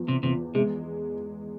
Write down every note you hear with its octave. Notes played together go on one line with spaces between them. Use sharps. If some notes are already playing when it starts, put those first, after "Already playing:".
Already playing: E2 F3
C3
E2 C3
C3 G#3